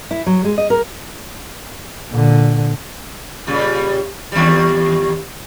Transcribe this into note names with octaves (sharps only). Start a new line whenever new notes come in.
E4
F#3
G#3
D#5
A#4
A#2 D3
A#2 C#3 G3
D#2 G3